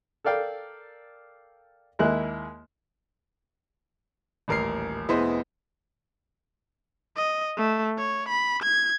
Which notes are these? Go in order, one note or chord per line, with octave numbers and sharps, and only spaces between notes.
A4 A#4 D5 F5 G5
D#2 G#3 A#3 E4 F#6
D#1 A1 A#4 F6 C7
F1 B3 E4 G#4 C5 D#5
D#5
A3
C#5
B5
G#6